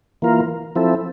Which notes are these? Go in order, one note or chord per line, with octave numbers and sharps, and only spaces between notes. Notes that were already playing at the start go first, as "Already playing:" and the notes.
E3 A#3 F4 A#4
F3 C4 E4 A4